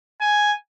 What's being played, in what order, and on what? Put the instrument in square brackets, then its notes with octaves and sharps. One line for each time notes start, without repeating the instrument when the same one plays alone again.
[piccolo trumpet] G#5